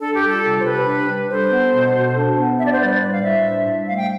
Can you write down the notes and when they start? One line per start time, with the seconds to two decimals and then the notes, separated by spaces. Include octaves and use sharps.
0.01 D4 A4
0.15 G4
0.22 G3
0.29 F4 A4
0.44 C3
0.60 C5
0.65 C3 G4 B4
0.87 D4
1.09 G3
1.30 D4 A4 C5
1.52 B3
1.73 B2
1.94 B2
2.15 D4
2.37 B3
2.59 D4 E5
2.66 D5
2.73 C5
2.80 G3 B4 D5
3.02 A2
3.13 F5
3.23 A2 C5 E5
3.45 D4
3.66 G3
3.88 A3 F5
3.98 G5